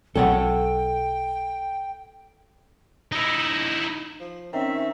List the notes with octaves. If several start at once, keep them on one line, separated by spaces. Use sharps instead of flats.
B1 F#3 C4 A4 C#5 F#5 G5
D#4 E4
F3
D#3 C4 C#4 E5